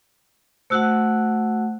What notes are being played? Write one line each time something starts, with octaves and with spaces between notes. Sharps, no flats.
A3 F#4 C5 F#5 E6 F#6